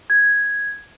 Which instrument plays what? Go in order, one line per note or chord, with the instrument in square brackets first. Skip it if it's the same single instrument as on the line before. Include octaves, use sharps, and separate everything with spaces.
[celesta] G#6